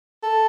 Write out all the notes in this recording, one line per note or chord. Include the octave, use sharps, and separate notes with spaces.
A4